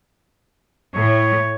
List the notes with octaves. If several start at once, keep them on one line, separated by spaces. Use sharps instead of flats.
A2 C#5